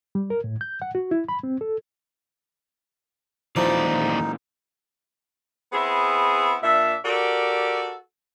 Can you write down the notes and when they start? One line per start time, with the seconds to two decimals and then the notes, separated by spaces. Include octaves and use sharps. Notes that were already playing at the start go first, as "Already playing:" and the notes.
0.15 G3
0.30 A#4
0.44 A2
0.61 G6
0.82 F#5
0.95 F#4
1.11 E4
1.29 B5
1.43 C4
1.61 A4
3.56 D#2 A#2 E3 F3 D#4 D5
5.73 B3 C4 E4 G#4
6.63 A#2 D4 E5
7.04 F#4 G4 A4 A#4 D5